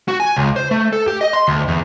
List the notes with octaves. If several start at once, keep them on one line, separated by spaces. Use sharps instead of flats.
F#4
G#5
C#2
C5
A3
A4
G4
D#5
C6
D2
E2